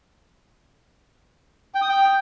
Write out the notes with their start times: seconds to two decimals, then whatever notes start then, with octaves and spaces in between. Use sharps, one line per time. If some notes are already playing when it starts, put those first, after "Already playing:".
1.74 G5
1.81 D#6
1.88 G5